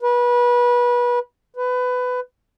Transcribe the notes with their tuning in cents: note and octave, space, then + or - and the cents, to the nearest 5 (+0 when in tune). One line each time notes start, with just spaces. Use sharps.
B4 -25
B4 +20